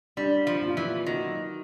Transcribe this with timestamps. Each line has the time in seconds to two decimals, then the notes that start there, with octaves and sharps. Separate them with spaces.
0.17 G3 D4
0.47 F3
0.62 A#2
0.77 E3
1.06 D#3 F#3